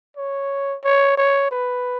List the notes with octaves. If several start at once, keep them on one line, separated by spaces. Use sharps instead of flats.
C#5
C#5
C#5
B4